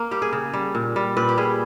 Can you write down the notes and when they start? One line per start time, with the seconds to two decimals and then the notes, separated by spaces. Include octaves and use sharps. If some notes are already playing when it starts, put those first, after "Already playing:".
Already playing: A#3
0.11 G3 G4
0.22 G#4
0.33 C#3
0.53 G3
0.75 A#2
0.96 G3
1.17 A#2 B4
1.29 G4
1.37 G3 G#4